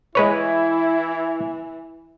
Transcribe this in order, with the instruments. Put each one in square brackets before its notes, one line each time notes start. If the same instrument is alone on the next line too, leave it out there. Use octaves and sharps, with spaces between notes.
[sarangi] E3 [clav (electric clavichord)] G#3 B4 C#5 [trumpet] E4